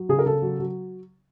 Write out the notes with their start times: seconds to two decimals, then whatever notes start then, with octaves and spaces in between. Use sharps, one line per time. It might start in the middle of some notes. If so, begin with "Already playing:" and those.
Already playing: F#3
0.09 C#3 G#4
0.19 A#4
0.26 C#3 A4
0.42 F#3
0.59 F#3